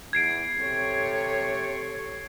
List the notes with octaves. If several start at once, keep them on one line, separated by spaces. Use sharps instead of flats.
E2 G#6 C7 D7
C3 A4 C#5